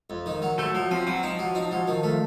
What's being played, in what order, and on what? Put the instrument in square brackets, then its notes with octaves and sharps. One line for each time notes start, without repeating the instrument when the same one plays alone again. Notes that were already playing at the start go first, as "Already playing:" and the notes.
[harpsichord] F2
D#3
F#3
[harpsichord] F#3 [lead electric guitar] A3
[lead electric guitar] F3 [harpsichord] F#3
[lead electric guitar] F3 [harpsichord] C4
[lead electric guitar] F#3 [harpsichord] C4
[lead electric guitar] F3 [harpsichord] D#4
[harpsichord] F#3
D#4
F#3
D#3
A3